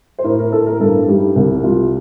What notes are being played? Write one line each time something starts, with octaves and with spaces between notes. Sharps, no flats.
C5
A2 A#4
A#4
A2 A4
A#4
G2 A4
G3 D#4
C2
G3 F4